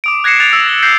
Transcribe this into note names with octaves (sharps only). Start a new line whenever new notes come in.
D6 D#6 D7
F#6 G#6 A#6 C7 C#7 E7
F#6 A6 F7
E6 C#7
A#6 G7
G6 A#6 C7